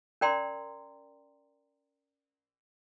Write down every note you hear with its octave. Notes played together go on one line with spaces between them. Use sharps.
C#4 A#4 D5 G5 A#5 C6